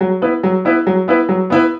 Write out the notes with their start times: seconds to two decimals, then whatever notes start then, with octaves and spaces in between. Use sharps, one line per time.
0.01 F#3
0.22 B3 E4 B4
0.43 F#3
0.65 B3 E4 B4
0.87 F#3
1.08 B3 E4 B4
1.29 F#3
1.50 B3 E4 B4